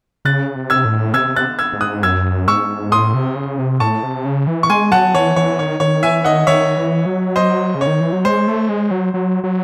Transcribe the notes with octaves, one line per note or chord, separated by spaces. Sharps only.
C#3 F#6 A6
C3
E6 G#6
A2
C3 E6 G#6
F#6 A6
E6 G#6
G#2
D#6 F#6
F#2 E6 G#6
G#2 C#6 E6
A2 C6 D#6
C3
C#3
C3
A2 A5 C#6
C3
C#3
E3
C#6
G#3 G#5 C6
F#3 F#5 A5
E3 C#5
E3 C#5
D#3 C#5
D#3 C#5
E3 E5 G#5
D#3 D#5 F#5
D#3 C#5 E5
E3
F#3
C5 D#5
C#3
C#5
D#3
E3
F#3
G#3 C5
A3
G#3
F#3
F#3
F#3